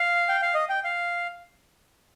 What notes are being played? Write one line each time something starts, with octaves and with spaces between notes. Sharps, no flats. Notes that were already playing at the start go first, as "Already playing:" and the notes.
Already playing: F5
G5
F5
D#5
G5
F5